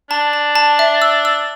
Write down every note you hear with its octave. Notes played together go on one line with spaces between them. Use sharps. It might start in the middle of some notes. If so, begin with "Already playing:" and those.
D4 A5
A5
A5
E5
E6
E6